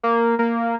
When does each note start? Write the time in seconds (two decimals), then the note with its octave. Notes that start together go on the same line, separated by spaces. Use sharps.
0.03 A#3
0.39 A#3